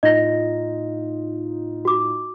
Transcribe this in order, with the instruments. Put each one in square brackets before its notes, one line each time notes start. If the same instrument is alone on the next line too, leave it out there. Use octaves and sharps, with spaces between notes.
[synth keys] A2 D#4 F4 [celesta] D#5 A#6
[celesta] F#4 D6